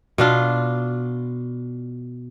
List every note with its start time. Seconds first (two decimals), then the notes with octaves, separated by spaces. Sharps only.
0.18 B2 D4 F4